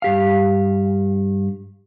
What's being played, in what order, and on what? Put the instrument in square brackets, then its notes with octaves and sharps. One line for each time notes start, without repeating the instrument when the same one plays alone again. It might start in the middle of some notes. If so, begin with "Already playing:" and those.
[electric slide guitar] G2 G4 F5